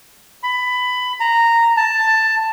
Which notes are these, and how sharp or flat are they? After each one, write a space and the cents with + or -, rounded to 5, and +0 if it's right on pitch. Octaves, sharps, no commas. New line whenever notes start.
B5 +15
A#5 -10
A5 +10